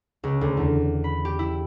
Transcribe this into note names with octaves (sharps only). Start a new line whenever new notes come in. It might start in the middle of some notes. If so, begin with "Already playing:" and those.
C#2
D2
E2
B5
G4
E4